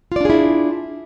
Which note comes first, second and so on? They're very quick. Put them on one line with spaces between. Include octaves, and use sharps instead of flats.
F4 D5 D4 G#4 E4